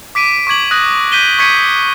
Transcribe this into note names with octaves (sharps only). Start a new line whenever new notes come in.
D6 B6 D7 D#7
C#6 D6 G#6 F#7
D#6 F#6 A#6
G6 B6 D#7 G7
C#6 G6 G#6 B6 C#7 D#7